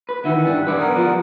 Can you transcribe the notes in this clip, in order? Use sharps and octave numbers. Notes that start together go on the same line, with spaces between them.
B4
D#3 E3 E5 F#5
G2 G3 D4
B1 B4 D5
A#4 F#5 D#6
F3 G3